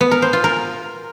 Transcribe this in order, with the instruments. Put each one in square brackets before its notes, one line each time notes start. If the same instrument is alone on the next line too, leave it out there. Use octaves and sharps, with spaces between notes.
[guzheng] B3
A#4
C5
F4
A#4